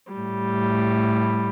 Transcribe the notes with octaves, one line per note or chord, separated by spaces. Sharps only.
A2 G3